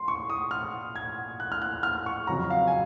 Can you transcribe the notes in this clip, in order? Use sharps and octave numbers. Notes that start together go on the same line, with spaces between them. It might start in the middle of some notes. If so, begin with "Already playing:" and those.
Already playing: C6
C#6
D#6
F6
G#6
F#6
F6
F#6
F6
C#6
F2 C#3 F#3 C#4 A#5
F5
G#5